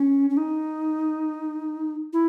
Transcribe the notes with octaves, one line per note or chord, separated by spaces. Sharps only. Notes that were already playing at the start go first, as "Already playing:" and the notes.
Already playing: C#4
C#4
D#4
E4